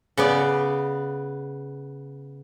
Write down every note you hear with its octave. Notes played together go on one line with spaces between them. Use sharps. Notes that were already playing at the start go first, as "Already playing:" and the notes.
C#3 B3 D5